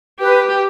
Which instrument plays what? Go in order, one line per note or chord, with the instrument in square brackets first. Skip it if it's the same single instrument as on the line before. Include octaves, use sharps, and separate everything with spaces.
[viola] G4 [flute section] B4